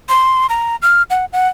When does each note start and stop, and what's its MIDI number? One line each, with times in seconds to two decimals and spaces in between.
0.09 0.47 84
0.49 0.76 82
0.82 1.02 89
1.10 1.25 78
1.33 1.48 78